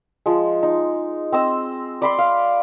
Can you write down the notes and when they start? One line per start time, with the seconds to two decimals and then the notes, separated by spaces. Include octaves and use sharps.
0.26 F3 G#3
0.63 D#4
1.32 C4 D#5 E6
2.02 D5 B5 C6
2.19 F5